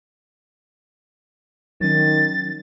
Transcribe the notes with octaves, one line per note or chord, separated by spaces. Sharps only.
D#3 F#3 C#4 A6